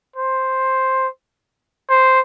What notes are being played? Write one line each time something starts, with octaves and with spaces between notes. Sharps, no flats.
C5
C5